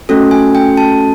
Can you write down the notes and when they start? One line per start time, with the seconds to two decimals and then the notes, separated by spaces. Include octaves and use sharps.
0.09 A3 C#4 F#4 A4
0.31 G#5
0.55 G5
0.77 A5